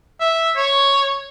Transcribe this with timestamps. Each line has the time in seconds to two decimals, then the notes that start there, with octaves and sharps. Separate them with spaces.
0.20 E5
0.56 C#5